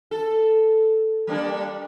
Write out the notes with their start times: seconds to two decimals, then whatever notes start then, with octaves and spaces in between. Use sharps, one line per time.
0.11 A4
1.27 G3 A#3 D4